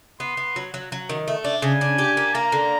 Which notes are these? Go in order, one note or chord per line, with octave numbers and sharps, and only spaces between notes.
B3 C6
B3
F#3
F#3
F#3
D#3
A3
D4
C#3 G#5
D4
G4
A#3
A#3 A#5
D3